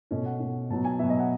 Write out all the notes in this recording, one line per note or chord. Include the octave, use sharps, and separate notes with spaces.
B2 A3 C#4 D#5
F#5
B2 A3 C#4
B2 F#3 B3 A5
G#5
B2 F#3 B3 E5
D#5
F#5